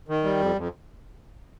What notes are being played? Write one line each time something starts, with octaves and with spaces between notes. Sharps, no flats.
D#3
G3
F2
F2